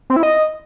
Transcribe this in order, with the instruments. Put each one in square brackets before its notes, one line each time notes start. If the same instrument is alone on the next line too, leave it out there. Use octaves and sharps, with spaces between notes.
[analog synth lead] C4
E4
D#5